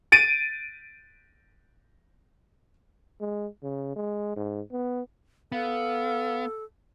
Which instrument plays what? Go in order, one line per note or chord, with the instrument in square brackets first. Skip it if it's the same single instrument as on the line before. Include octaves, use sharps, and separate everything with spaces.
[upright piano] A6 D7 D#7
[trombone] G#3
C#3
G#3
G#2
B3
[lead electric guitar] B3 [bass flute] A4 [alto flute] F5